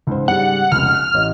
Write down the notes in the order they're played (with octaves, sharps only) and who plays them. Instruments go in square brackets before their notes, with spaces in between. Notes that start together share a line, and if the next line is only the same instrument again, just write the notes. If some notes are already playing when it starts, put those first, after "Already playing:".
[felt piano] C#2 G#2 C5
[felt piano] G#2 C#3 G3 [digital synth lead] F#5
[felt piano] F1 C#2 [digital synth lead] F6
[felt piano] F#6
A1 C#5 D#5